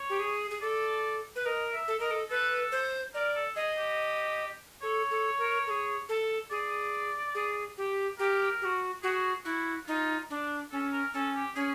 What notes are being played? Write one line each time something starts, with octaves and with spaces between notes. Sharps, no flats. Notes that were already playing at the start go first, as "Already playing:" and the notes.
Already playing: C#5
G4
G#4
G#4
A4 D5
B4
A#4 D#5
E5
A4
A#4 D#5
A4
A4 B4
C5
A#4 D5
A4
G#4 D#5
G4
A4 C#5
A4
A#4
A4
G#4
A4
G#4 D5
G#4
G4
G4 A#4
G4
F#4
F#4 G#4
E4 F#4
D#4 F4
D4
C#4 A4
A#4
C#4 A4
G4
C#4 G#4